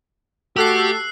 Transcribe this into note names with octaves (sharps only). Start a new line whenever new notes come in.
A3 F#4 G4 A4 E6 F#6 C7